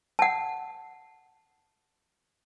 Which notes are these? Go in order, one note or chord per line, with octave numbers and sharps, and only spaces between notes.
F#5 A5